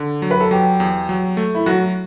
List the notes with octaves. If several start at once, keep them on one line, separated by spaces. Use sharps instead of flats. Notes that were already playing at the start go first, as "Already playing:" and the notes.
Already playing: D3
F#3
B4
A4
F#3 G4
E2
F#3
A3
E4
F#3 F#4